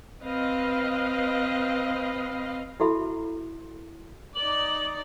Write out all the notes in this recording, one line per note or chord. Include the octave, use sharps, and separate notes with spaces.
C4 B4 D#5 F5
E4 F#4 A4 E5 B5
D#4 D5 F#7